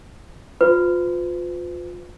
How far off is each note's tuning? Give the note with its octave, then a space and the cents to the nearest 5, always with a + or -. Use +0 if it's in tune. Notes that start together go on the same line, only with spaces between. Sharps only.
F4 +25 B4 +45